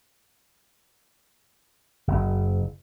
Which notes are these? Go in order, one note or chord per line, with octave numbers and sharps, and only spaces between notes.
F#1